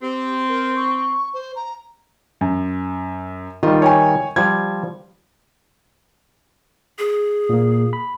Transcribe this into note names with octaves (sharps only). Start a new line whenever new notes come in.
C4 G4
A#4
C#6
C5
A#5
F#2
D#3 G3 F4
C#5 G5 G#5
F3 G3 G#6
G#4
A#2 A#3
B5